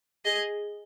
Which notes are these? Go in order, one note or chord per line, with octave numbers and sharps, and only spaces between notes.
G#4 D#5